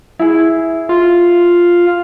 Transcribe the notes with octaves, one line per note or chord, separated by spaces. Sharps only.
E4 G#4
F4